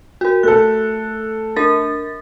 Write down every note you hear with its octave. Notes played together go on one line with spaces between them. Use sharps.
F#4 A#4
A3 A4 F#6
D4 A#4 A6